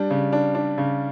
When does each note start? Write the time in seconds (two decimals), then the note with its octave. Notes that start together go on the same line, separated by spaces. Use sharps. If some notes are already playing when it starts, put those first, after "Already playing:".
Already playing: G3 D4
0.10 C#3
0.32 D4
0.55 D4
0.78 C#3